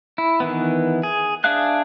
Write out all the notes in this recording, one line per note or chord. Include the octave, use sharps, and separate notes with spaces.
E4
D#3 E3 B3
G#4
D4 G#4 E5 F5 F#6